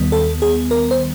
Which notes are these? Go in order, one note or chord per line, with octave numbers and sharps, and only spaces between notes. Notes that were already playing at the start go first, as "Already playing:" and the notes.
Already playing: D#2 D#3 G3 B3
A4
G#4
A#4
C5